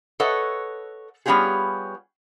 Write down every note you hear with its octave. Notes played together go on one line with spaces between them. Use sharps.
A4 B4 C#5 D#5 F#5
G3 B3 C#4 F4 G4 G#4